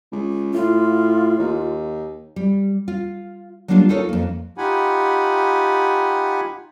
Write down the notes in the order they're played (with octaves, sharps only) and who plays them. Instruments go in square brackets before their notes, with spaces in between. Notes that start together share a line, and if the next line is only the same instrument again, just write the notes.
[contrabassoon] C#2
[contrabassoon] A2 [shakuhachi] F4
[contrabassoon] D#2
[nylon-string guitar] G3
F4
F#3 G3 A#3 D4 D#4 F4
D#4 F4 A4 A#4 C#5
F2 A#3
[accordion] D#4 F4 G4 F#5 G#5 B5